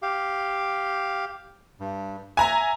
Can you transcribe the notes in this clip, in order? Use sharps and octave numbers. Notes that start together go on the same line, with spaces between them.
G4 F5
G2
E5 G#5 A#5